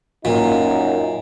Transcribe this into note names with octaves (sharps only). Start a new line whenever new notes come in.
F#2 A#2 D#4